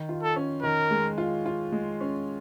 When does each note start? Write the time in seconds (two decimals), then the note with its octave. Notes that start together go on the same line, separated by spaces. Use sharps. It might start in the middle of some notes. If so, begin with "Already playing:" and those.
Already playing: D#3
0.09 F4
0.23 A4
0.36 C#4
0.63 D#3 A#4
0.91 G#3
1.18 F4
1.46 F4
1.72 G#3
2.01 C#4